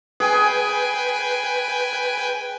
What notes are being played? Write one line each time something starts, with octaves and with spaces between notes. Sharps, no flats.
G#4 B4 G5 G#5